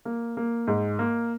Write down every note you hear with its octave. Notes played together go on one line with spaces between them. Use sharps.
A#3
A#3
G#2
A#3